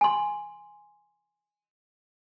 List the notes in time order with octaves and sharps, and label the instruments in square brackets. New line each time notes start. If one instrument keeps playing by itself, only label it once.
[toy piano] G#5 C6